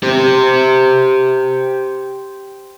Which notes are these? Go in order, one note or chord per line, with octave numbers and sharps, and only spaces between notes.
G4 C5